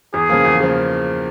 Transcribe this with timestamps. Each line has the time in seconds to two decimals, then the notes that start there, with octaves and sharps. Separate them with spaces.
0.14 E2 G#4
0.29 C#3 F3 A#3
0.45 E2
0.60 C#3 F3 A#3